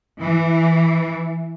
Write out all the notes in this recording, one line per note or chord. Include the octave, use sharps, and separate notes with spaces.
E3